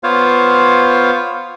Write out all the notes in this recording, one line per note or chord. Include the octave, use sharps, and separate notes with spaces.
B3 F4 C5 C#5 F5